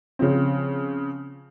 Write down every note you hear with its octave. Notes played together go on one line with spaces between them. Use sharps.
C#3 F3 C4